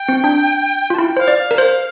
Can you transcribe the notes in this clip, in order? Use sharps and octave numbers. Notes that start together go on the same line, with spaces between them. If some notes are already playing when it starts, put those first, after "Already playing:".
Already playing: G5
C4
D4
F4 A5
E4 G5
C5 F5
D5
F5
A#4
C5